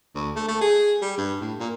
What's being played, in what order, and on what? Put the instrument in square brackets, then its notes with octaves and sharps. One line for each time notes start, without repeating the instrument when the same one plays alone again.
[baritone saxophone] D2
A3
A3
G#4
G3
G2
A2
A#2